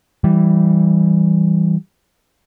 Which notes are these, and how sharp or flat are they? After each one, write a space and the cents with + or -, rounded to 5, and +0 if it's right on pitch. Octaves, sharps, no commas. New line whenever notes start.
E3 +0 G3 -10